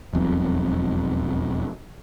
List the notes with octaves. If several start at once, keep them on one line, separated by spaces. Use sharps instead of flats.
E1 B1 F2